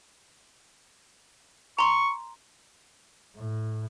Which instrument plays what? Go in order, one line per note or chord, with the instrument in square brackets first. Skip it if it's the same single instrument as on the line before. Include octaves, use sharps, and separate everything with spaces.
[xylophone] A#5 C6 [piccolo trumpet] C#6
[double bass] A2